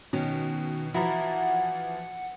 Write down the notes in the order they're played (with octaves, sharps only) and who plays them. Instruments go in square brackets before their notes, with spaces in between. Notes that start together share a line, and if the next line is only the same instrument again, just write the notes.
[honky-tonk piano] B2 [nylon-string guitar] D#3 C#4
[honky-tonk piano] E3 F3 [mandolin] E4 A#5 [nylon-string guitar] F#4 [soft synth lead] F#5